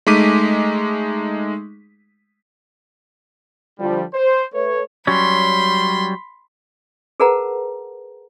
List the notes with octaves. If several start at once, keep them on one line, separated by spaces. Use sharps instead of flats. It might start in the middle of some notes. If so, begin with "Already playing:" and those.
G#3 A3 D#4 D6 B6 D#7
D3 F3 G3
C5
A3 B4 C#5
F#3 G3 C#4 B5 C6
G#4 A#4 B4 F#5 A5 A#5